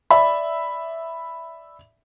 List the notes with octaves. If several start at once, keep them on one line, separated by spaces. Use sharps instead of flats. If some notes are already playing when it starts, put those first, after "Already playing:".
D5 E5 B5